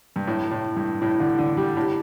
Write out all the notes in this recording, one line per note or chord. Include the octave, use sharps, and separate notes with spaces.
G2
A2
A2
G2
A2
D3
D3
G3
A2